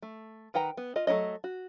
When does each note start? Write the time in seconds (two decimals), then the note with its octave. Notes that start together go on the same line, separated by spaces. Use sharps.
0.02 A3
0.54 D#3 B4 F#5 G5 A#5
0.77 B3
0.96 F4 D#5
1.07 F#3 A3 E4 C#5 D#5
1.44 F#4